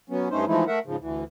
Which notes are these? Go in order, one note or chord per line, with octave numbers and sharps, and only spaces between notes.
F#3 B3 C#4
G2 A3 C#4 D#4 C5
E3 F3 G#3 A3 D#4 E4
A3 A#4 E5 F#5
G#2 C#3 F3
D2 E3